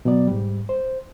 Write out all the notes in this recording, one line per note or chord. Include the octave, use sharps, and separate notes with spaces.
B2 F#3 B3 D5
G#2 G3
C5